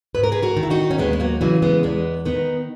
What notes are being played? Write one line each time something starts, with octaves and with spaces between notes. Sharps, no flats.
G#2 B4
A#4
G#4 B4
F#4 A#4
D#3
E4
D#4 F#4
C#4
D#2 G#3 B3
B3
F#3 A#3
C#3 E3 F#3
G#3 B3
E2 G#3 B3
D#3 B3 D#4